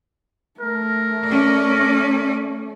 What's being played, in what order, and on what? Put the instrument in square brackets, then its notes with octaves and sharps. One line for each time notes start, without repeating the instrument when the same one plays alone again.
[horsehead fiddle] A3 [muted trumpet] A#4
[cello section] C#4 D5